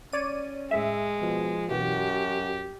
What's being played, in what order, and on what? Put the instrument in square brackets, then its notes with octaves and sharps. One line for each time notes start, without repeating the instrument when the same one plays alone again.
[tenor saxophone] C#4 [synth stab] C#5 D5 D#7
[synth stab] A2 E5 [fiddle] G#3
[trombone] B2 [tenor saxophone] F3
[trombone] F#2 [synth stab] B2 E3 [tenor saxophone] F#4 [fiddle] G4